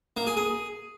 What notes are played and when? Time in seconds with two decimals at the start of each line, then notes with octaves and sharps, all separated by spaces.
0.17 A#3
0.27 G#4
0.37 G#4